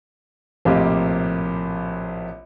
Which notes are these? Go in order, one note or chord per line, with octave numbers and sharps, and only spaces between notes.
A#1 A2 C3 A#3 G4 D#5